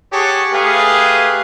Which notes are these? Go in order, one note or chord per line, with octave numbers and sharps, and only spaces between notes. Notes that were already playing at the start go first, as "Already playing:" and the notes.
G4 G#4 C#5 F#5 A5
A3 G4 G#4 B4 F5